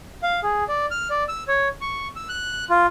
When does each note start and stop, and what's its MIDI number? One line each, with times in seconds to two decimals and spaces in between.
0.23 0.40 77
0.43 0.64 68
0.69 0.86 74
0.91 1.08 89
1.10 1.24 74
1.28 1.44 88
1.48 1.68 73
1.81 2.08 85
2.16 2.28 88
2.29 2.65 90
2.70 2.86 65